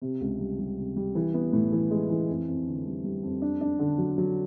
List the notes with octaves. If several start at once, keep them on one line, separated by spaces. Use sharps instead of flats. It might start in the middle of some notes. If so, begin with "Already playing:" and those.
C3
C#2
G3
G3
C3
G3
E3
B3
A2
E3
G#3
E3
F2
F2
D3
G3
G3
F2
D4
D4
D3
F#3
F#3